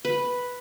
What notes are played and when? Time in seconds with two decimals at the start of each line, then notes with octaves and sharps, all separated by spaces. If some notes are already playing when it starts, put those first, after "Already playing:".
0.05 B4